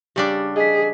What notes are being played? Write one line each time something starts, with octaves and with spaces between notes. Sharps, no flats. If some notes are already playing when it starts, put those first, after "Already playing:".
C#3 G3 D4 G4
G#4 D#5 B6